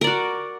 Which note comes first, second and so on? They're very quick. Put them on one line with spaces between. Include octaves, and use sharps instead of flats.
A#4 D5 F#4